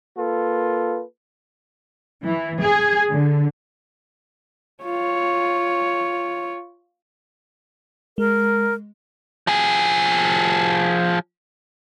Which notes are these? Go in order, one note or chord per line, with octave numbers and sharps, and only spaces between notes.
A#3 F4 A4 B4
E3
G#4
D3
F4 C#5
G#3 A#4
F3 G#4